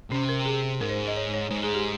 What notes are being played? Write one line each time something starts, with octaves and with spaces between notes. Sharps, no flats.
C3 C#4
A#4
G#4
G#2 A#4
C5
D#5
C#5
C#5
G#2
G#4
G4